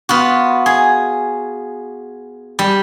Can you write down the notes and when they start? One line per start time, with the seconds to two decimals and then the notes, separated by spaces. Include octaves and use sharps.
0.09 B3 F4 F#4
0.66 G#4
2.59 G3